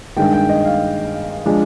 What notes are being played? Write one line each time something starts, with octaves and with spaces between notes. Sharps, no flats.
G2 D#3 G#3 G5
G5
D#5
F5
F3 G#3 D4